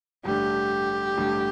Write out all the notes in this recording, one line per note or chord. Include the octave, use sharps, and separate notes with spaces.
A1 G2 D3 A3 G4
A1 G2 D3 A3